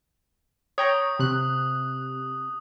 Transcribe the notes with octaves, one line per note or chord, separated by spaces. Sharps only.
C#5 G5 A#5 D#6
C3 F#6